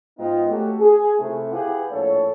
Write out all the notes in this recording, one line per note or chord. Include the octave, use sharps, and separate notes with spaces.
G#2 B3 D#4 F4 D#5 G5
A3 C#4 F#4 G4 A4
G#4
C3 A3 E4
E4 G4 G#4 B4 F5 F#5
A#1 A2 A4 C#5